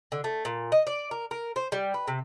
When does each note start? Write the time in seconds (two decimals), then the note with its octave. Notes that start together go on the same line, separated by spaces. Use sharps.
0.12 D3
0.24 A3
0.45 A#2
0.72 D#5
0.87 D5
1.11 A#4
1.31 A#4
1.56 C5
1.72 G3
1.94 B4
2.08 C3